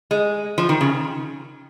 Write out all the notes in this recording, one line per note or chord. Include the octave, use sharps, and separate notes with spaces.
G#3
F3
D#3
C#3